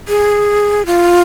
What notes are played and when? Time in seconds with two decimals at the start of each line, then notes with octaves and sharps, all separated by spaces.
0.08 G#4
0.86 F4